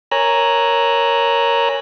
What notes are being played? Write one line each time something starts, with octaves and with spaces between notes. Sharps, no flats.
A#4 C#5 G#5 A#5 E6 F#6